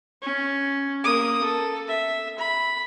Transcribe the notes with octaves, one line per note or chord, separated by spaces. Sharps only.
C#4
A#3 D#6
A4
E5
B5